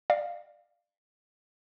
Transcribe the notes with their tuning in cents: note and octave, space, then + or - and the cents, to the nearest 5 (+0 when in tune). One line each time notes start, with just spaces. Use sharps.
D5 +25 F5 +0